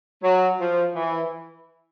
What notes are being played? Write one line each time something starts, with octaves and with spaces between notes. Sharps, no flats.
F#3
F3
E3